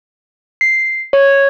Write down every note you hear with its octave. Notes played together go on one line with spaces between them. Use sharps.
C7
C#5